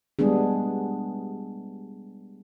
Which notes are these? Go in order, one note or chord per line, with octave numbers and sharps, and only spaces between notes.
G3 G#3 B3 D4 G#4